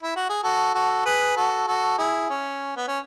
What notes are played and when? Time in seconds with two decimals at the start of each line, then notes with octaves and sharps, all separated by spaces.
0.03 E4
0.16 F#4
0.29 G#4
0.43 F#4 A4
0.74 F#4 A4
1.05 G#4 B4
1.36 F#4 A4
1.67 F#4 A4
1.98 E4 G#4
2.30 C#4
2.76 B3
2.88 C#4